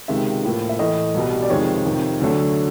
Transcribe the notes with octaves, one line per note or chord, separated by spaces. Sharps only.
C#2 C3 D#3 G#3 E5
A2 F3 A#3
E5
A2 E3 A3 D#5
C2 B2 G3
D5
F2 C3 D#3 G#3 C#5
F2 C3 D#3
D2 D3 F#3 A3